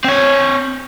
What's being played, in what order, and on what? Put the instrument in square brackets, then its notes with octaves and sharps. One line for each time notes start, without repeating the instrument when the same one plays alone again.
[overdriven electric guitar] C4 C#5